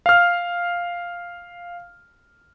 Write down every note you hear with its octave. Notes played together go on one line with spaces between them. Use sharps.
F5 F6